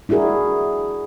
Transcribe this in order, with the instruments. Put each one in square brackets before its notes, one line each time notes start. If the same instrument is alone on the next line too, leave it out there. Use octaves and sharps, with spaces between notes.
[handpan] D4 E4 F#4 G#4 A#4